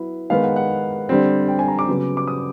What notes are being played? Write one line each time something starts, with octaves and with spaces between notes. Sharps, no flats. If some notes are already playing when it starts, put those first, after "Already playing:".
Already playing: F#3 B3 E4
D#3 G#3 B3 D#4 F5
F#5
F#5
D3 G3 C4
G5
G#5
A#5
D6
C#3 F#3 B3
D6
D#6